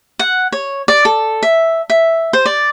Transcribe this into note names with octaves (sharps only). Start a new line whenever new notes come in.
F#5
C#5
D5
A4
E5
E5
C5
D5